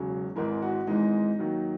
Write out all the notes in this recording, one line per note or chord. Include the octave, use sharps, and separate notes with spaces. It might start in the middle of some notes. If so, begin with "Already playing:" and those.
Already playing: E1 C#3 F#3
G#1 G#2 E3 G#3 A#4
F#4
G#1 G#2 E3 G#3 D#4
D#2 D#3 F#3